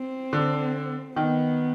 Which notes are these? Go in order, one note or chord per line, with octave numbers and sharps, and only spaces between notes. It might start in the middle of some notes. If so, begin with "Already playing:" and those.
Already playing: C4
D3
D#3 B3